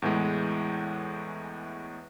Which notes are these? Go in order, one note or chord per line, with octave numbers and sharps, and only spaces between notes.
E2 A2 E3 G#3